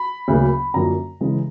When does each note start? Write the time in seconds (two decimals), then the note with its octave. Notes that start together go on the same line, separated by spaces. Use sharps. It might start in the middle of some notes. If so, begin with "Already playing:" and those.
Already playing: B5
0.28 D2 C#3 F#3 A#3
0.74 F#2 D3 F3 A#3 A#5
1.21 C#3 E3 G#3